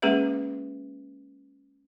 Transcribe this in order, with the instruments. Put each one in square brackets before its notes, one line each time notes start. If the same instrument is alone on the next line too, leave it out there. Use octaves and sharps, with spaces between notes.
[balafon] G#3 A#3 C#4 G#4 B4 E5